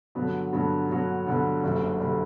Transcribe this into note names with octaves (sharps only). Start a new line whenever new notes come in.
G2 D3 F#3 B3
G2 D3 F#3 B3
G2 D3 F#3 B3
G2 D3 F#3 B3
F#1 F#2 D3 G3
D3 G3